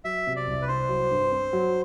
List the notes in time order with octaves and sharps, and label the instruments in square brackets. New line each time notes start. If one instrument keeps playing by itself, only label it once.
[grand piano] F#3 [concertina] E5
[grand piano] C3
[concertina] D5
[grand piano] C2
[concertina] B4
[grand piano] C4 [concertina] C5
[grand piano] F#3
G2
C4
F#3